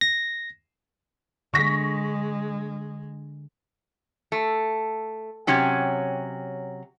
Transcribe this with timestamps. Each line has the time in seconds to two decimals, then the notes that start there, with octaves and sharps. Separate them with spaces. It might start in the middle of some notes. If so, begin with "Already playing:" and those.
0.01 A#6
1.54 D3 G#3 C#6 A#6 B6
4.32 A3
5.47 C3 F#3 C#4 G4